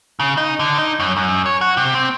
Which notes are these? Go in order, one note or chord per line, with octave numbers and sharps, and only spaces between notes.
C#3
D#4
D3
D#4
F#2
F#2
C#5
F#4
C3
C4